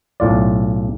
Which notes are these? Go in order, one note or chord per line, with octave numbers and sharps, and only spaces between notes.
B1 A2 F4 D5